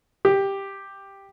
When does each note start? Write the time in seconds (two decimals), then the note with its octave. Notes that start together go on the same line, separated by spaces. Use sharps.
0.25 G4